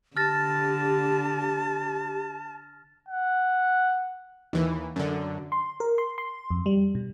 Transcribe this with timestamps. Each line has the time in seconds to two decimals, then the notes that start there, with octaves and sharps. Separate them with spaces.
0.17 D3 G4 A5 F6 A6 A#6
3.09 F#5
4.53 D#2 E3
4.96 F#2 D3
5.52 C6
5.80 A#4
5.98 C6
6.18 C6
6.51 F2
6.66 G3
6.95 B2